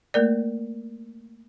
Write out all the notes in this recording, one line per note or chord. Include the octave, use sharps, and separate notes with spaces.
A3 A#3 A#4 D5